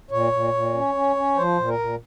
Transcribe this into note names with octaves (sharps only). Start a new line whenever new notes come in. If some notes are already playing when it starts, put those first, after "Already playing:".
A#2 C#5
A#2
A#2
C#4
C#4
C#4
F3 C5
A#2
A#4
A#2